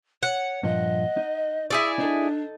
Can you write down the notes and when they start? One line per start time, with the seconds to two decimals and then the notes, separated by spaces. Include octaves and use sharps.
0.23 C#5 F#5
0.63 G2 A#2 F3 D#5
1.17 D#4
1.71 E4 G#4 D5 E6
1.99 D4 D#4 A4